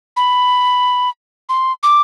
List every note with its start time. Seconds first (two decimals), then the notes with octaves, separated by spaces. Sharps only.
0.17 B5
1.49 C6
1.83 D6